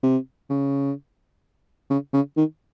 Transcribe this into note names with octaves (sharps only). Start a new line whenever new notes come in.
C3
C#3
C#3
C#3
D#3